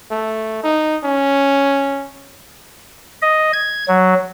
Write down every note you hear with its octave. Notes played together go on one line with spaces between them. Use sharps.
A3
D#4
C#4
D#5
G#6
F#3